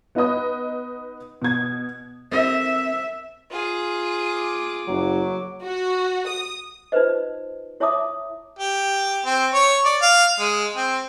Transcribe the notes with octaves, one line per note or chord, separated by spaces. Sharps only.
B3 D#4 B4 D#5 D#6
B2 G#6
C4 G4 A#4 E5
F4 G#4
D6
F#1 F#3
F#4
D#6
D#4 F4 B4 C5 D#5
E4 C#5 E5 A5 D6 D#6
G4
C4
C#5
D5
F5
G#3
C4